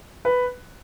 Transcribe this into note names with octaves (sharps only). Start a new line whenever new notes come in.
B4